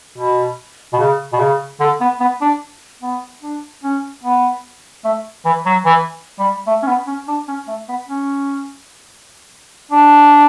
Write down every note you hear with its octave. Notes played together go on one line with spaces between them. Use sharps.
B2
B2
C#3
B2
C#3
D3
B3
B3
D4
B3
D4
C#4
B3
A3
E3
F#3
E3
G3
A3
C#4
B3
C#4
D4
C#4
A3
B3
C#4
D4